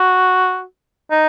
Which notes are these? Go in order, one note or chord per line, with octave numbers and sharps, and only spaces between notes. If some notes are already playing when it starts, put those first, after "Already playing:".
Already playing: F#4
D#4